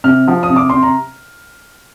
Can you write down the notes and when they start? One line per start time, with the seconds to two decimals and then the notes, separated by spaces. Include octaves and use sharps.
0.04 C3 F6
0.28 F3
0.43 D#6
0.49 C3
0.56 D6
0.69 C3 C6
0.83 A#5